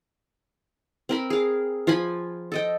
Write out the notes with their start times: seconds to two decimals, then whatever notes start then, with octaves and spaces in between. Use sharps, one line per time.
1.09 C4 A#4 B5
1.30 G#4 F5
1.87 F3 F4 G#5 B5
2.52 A4 D#5 G5